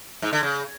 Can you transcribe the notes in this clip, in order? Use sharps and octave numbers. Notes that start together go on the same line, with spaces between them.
G#2
D3
C#3